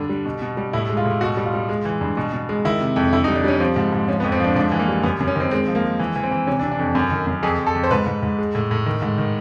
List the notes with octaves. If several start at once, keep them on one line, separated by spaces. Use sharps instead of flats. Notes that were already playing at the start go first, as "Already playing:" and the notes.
Already playing: G2 D3 D4
G3
B2
B2
G3
A2 E4
G#3
F4
A2
B2 F#4
G3
F4
G3
G#3
E3
G2
B2
B2
G#3
D#3 E4
C3
F2
D3 E4
D#4
G3
D4
G3 C#4
F3 C4
G#2
G#2
F3 C#4
B3
F2
C4
F3 D4
G#2 D4
E3
A#3
G3
F#2 B3
F#2
C#4
D#3 C4
G#3 C4
F3
A#3
G#3
E3
E3
C4
E3
C3 C#4
D4
C3
D4
F2
F#2
D#3
F#2
F2 G#4
F2
A4
F2
C5
G#2 B4
G#2
G#2
G#3
A2
A2
D#3
G#2
D#3